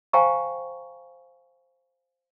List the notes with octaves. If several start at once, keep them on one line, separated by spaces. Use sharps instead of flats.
C5 F5 G5 G#5 A#5 C#6